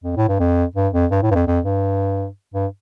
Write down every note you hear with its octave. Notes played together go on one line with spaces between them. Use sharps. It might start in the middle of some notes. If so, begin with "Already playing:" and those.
F2
A2
G2
F2
G2
F2
G2
A2
G2
F2
F2
G2
G2